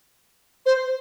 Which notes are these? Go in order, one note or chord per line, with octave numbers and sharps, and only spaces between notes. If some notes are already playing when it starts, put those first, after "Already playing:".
C5